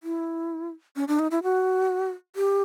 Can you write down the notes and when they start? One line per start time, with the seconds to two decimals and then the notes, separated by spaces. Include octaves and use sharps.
0.03 E4
0.96 C#4
1.08 D4
1.19 D#4
1.31 E4
1.43 F#4
2.36 G4